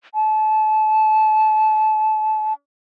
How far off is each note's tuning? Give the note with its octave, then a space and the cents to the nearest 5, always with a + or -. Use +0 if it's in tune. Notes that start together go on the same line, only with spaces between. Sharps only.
A5 -30